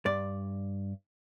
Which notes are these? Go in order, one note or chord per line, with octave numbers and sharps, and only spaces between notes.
G2 D5